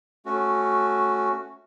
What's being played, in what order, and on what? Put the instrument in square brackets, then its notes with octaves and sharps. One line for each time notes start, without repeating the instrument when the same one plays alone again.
[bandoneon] A3 C#4 F#4